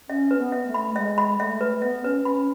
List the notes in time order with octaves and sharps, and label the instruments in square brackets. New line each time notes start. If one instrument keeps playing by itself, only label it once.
[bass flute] C#4 [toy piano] E5
[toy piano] B4
[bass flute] B3
[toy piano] E5
[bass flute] A3
[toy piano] B5
[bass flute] G#3 [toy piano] E5
[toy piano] B5
[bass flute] A3 [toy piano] E5
[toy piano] B4
[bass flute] B3 [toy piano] E5
[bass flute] C#4 [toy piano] B4
[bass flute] C#4 [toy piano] B5